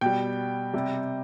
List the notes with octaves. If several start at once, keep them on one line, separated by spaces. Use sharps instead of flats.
B2 G3 G5
C3 G3